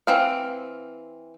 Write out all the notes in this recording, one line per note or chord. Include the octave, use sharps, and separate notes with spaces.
E3 C4 F5